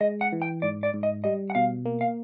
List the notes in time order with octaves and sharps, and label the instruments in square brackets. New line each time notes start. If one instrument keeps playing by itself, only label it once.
[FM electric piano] G#3 [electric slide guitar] D#5
[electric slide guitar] F#5
[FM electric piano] E3
[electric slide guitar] G5
[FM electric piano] G#2 [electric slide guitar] D5
[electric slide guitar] D5
[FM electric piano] G#2
[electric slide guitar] D#5
[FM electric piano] G3 [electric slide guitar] D#5
[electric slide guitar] F#5
[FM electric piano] B2 [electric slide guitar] F5
[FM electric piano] A#3
[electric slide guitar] F5